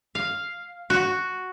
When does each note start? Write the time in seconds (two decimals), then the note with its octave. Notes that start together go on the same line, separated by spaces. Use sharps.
0.15 F5
0.90 F#4